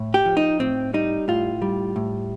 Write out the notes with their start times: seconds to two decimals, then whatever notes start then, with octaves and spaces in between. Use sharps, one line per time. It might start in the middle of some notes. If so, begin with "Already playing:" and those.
Already playing: A2
0.14 G4
0.25 F3
0.37 D#4
0.59 A2 C4
0.94 G3 D#4
1.28 A2 F4
1.62 G3
1.96 A2